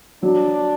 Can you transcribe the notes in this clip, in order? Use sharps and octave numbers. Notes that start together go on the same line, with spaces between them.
F#3 D4